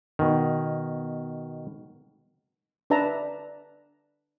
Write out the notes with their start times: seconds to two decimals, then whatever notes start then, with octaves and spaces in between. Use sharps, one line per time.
0.19 B2 D#3
2.90 D4 B4 D5 E5 A5 A#5